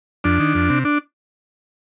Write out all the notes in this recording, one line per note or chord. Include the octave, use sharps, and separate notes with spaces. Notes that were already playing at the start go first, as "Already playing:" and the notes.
F2 D4
D#3
F2
C3
D4